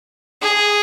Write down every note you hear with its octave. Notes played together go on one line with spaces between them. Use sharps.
G#4